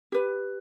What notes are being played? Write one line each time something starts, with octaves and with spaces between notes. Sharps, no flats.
G4 B4